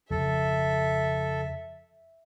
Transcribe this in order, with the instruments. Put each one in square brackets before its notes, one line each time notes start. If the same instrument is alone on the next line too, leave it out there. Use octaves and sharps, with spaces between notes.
[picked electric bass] F2 C#3 F3 [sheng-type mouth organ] A4 [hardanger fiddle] E5